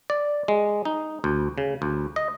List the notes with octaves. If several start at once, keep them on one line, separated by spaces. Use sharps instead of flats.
D5
G#3
D#4
D2
C#3
D2
D#5